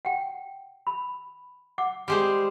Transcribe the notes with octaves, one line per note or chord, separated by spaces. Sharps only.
F#5 G5
B5
F#5 D6
G3 G#3 C5